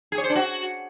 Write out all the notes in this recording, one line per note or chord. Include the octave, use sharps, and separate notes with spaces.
G#4
C#5
C5
D4
F#4